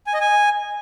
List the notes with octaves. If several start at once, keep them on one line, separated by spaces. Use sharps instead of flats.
G#5
D#5
G#5